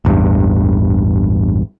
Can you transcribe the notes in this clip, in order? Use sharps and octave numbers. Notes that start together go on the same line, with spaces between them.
A1 E2 G2